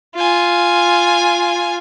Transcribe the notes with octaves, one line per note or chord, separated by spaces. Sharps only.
F4 G#5